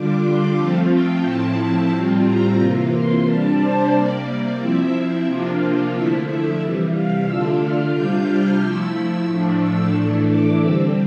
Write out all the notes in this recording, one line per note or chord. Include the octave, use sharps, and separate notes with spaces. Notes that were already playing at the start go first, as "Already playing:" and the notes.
Already playing: D3 G3 D4 F4 D6
C6
F3 A3 C4 F4 A5
G5
A2 F3 C4 E4 A5
A2 G3 C4 F4
A#5
C3 E3 A#3 F4
C6
C3 G3 D4 A5
C5
C3 G3 A#3 D5
D5
F3 C4 E4 E5
C3 F3 A#3 D4 F4
D3 F3 A3 E4 E5
E5
C3 E3 G3
F5
D3 A3 D4 F4 E6
F6
C3 G3 D4 F4 G6
F6
F3 A3 E4 E6
A2 F3 A3 D4
E6
A2 E3 A3 D4
D6
D3 G3 C4 E6